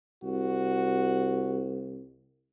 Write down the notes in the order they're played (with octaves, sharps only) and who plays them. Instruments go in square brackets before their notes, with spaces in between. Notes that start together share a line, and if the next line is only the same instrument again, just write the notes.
[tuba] C2 [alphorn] F#4